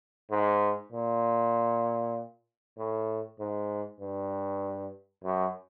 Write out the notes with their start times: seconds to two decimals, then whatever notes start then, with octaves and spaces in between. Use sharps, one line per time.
0.30 G#2
0.92 A#2
2.77 A2
3.39 G#2
4.00 G2
5.24 F#2